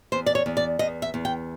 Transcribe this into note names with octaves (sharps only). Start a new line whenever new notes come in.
E2 C5
D5
C#5
E2
D5
E2 D#5
E5
E2
G5